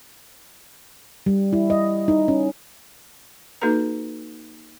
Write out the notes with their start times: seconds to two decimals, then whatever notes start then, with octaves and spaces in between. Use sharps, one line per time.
1.26 G3
1.53 E4
1.70 D#5
2.08 D#4
2.28 C#4
3.62 A#3 D#4 F#4 A4 B4 A#5